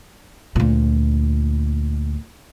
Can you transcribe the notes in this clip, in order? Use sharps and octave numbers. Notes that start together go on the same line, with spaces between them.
D2 A#2